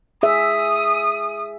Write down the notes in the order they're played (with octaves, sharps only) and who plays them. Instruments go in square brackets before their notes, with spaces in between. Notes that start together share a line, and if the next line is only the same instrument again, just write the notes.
[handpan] G#4 E5 [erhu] D#6